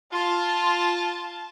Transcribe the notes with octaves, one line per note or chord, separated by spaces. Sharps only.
F4 A5